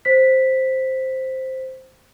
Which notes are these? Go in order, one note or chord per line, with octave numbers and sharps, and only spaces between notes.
C5 B6